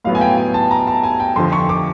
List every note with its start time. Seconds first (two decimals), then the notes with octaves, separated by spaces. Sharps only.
0.04 A2 F#3 B3 F5
0.15 G#5
0.21 G5
0.37 G#5
0.54 A5
0.71 A#5
0.87 A5
1.03 G#5
1.20 G5
1.36 F2 D3 F3 C6
1.53 C#6
1.69 D6